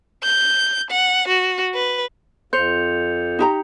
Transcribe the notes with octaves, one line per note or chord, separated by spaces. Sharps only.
G6
F#5
F#4
B4
F2 C5 G6 C#7 F7
D#4 G4 A#5